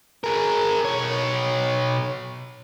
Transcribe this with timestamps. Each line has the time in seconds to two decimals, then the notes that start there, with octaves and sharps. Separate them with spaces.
0.24 G#4 A#4
0.85 B2 C#5